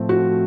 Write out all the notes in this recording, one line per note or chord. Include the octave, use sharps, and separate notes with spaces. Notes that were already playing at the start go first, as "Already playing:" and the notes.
Already playing: A2 F3 A3 C4
F#4